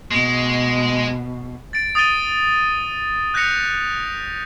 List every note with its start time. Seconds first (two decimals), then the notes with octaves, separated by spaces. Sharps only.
0.11 B2 G#3
1.73 A6 D7
1.95 D#6 A6 D7 D#7 G7
3.34 F#6 G6 A#6 B6 C#7 F7